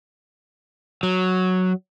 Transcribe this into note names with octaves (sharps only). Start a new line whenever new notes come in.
F#3